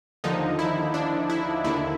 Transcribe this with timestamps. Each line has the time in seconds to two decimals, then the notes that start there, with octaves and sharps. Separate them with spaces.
0.24 D#2 D3 F3 D#4
0.59 E4
0.94 D4
1.30 E4
1.64 D#2 D3 E4